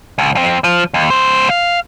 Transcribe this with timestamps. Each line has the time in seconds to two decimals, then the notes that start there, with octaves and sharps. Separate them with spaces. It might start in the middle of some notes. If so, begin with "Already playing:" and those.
0.18 C#2
0.35 F2 C4
0.64 F3
0.94 D#2
1.10 C#2 C5
1.50 F5